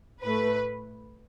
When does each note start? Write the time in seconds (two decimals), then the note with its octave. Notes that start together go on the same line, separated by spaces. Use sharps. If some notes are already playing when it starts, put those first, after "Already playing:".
0.22 A2 A3 B4